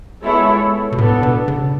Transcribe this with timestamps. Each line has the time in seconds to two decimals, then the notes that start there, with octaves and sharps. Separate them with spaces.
0.24 G#3 B3 E4 A4 C#5
0.92 B2
0.98 A2 B3 D4 A4
1.23 B2
1.48 C#3